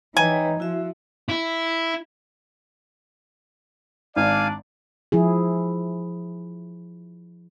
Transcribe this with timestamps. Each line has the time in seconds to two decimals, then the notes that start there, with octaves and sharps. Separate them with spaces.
0.17 E3 D#4 B4 C#5 G5 G#5
0.60 F3 E4 F#4 E5
1.29 E4
4.16 G#1 D4 D5 F5 G#5
5.12 F3 E4 G#4